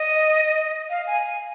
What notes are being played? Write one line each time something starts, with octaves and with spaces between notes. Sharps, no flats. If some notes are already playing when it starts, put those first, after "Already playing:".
Already playing: D#5
F5
G#5